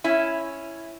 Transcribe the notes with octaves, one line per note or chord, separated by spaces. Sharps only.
C#4 E4